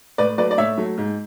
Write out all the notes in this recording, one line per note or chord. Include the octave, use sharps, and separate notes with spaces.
A2 B4 D5
F#3 A3 B4 D5
D5
A2 C#5 E5
F#3 A3
G#2